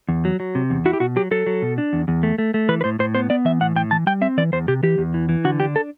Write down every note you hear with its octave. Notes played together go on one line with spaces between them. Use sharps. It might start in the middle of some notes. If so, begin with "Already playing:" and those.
E2
F#3
F#3
C3
E2
E4 F#4
G4
B2 F#4
F#3 G4
F#3 A4
F#3
B2
D4
E2
E2
A3
A3
A3
E3 B4
B4
A2 C5
A2 C5
B3 C5
B3 D5
E3 E5
A2 F#5
A2 G5
E3 A5
G3 G5
C4 E5
E3 D5
E2 C5
C3 G4
E3 G4
E2
E3
E3
D3 F#4
D4 G4
A4